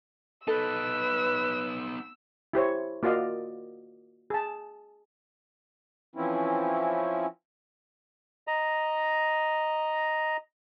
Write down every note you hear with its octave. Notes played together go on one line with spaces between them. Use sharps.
B3 D#4 A4 B4 E6
E4 G4 C5 C#5
A#3 F4 F#4 D5 D#5 F5
G#4 A5
E3 F3 C4 C#4 E4
D#5 A#5